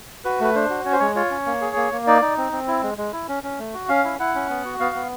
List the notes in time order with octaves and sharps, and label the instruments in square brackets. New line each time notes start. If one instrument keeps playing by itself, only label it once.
[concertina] F#4 B4
A3 B4
D4 C5
F#4
C#4 C#5
C5
G#3 C#5
F4 C#5
C#4
A#3
G#4
A#3
A#3
D#4 D5
D#4
C4
C4
E4
G#3
G#3
E4
C#4
C#4
A3
F#4
C#4 F5
E4
E4 F#5
C#4
B3
F#4
B3 F5
B3